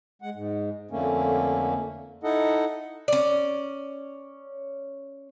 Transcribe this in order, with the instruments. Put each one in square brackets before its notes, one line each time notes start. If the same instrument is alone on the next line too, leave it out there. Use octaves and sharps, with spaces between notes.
[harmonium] G#3 F#5
G#2
F2 D3 A3 A#3 C#4
D#4 E4 A4 D#5 F#5
[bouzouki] C#4 D5